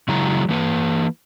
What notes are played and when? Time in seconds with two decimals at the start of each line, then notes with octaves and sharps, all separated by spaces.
0.08 C#3 F#3 G#3 E4 A#5
0.49 E3 A#3 B4